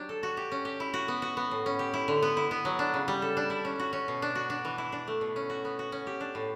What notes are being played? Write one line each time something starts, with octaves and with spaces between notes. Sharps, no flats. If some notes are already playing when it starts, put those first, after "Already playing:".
Already playing: F#3 D4 G4
A4
F#4
G4
C#4
G4
E4
F#4
B3
F#4
B3
A2
C#4
G4
E4
D3
B3
E4
B3
F#3
D4
C#3
G3
A4
D4
E4
C#4
F#4
C#4
B2
D4
F#4
D4
E3
E4
D4
A3
B2
C#4
F#4
B3
F#4
C#4
G4
D4
A2